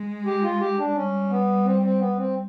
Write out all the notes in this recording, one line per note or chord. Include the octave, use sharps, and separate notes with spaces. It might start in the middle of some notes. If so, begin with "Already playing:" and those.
Already playing: G#3
G4
F4
G4
D4
G3 C#4
B3
C4
C4
B3
C4